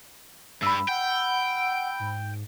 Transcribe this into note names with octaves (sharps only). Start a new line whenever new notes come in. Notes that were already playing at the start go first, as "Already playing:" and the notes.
G2 B5 E6
F#5 G5
G#2